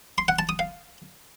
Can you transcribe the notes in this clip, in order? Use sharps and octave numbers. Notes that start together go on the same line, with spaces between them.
C6
F#5
A5
D#6
F5